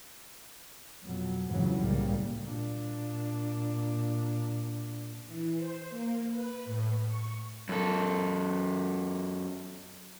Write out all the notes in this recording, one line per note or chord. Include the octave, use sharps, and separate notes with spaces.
F2 B2 F#3
F2 G#2 C#3 E3 F#3
C2 A2 C#3 G3 A#3
A#2 D4
E3
C5
A#3
B4
A2
C#6
F#2 A4